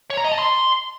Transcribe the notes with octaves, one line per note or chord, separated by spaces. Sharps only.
C#5
A#5
D#5
A5
C6